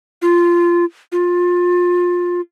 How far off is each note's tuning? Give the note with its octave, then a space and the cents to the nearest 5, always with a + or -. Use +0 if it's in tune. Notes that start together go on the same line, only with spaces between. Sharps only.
F4 -15
F4 +20